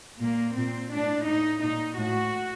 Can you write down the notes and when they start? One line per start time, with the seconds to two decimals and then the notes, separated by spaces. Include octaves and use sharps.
0.22 A#2 A#3
0.57 A#2 C4
0.92 A2 D4
1.27 A2 D#4
1.63 A#2 D#4
1.98 A2 F#4